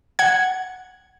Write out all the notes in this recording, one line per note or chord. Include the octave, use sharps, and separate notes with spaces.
F#5 G#6